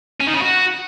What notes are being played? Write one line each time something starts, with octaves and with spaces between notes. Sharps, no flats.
C#4
D#3
C#3
F#4